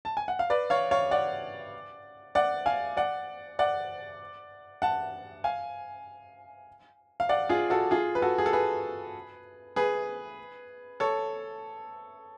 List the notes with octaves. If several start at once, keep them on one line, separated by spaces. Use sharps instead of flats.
A5
G#5
F#5
F5
B4 D5
C#5 F5
C#5 F5
D5 F#5
D5 F#5
F5 G#5
D5 F#5
D5 F#5
F#5 A5
F5 G#5
F5
D5 F#5
F4 G#4
F#4 A4
F4 G#4
B4
F#4 A4
G#4
A4
G#4 B4
G#4 B4
A4 C#5